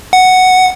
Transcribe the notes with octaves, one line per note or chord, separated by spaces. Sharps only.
F#5